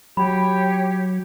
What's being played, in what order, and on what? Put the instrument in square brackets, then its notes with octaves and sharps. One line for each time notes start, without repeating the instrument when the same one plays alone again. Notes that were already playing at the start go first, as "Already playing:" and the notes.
[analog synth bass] F#3 [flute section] G4 C#5 [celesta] B5